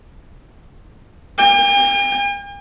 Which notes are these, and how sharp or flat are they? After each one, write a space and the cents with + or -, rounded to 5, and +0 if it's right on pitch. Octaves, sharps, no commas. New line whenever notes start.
G5 +45